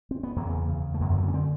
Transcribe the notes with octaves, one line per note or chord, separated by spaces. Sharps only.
C4
B3
E2 C#3 A#3
E2 C#3
A3
F#2 D3 A#3
B3
A#3
B3
C#4
D3 C4